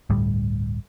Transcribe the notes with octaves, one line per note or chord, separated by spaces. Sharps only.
G1 D2 A2 G3